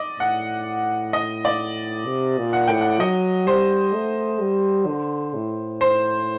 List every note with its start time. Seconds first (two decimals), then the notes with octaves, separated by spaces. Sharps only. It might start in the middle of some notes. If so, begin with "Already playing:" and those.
Already playing: D5 D#5
0.19 A2 F#5
1.13 D#5
1.45 D5
2.06 C3
2.38 A#2
2.53 F#5
2.68 A2 G5
2.81 F#5
3.00 F#3 D#5
3.47 G3 C5
3.94 A3
4.40 G3
4.87 D3
5.35 A2
5.81 C5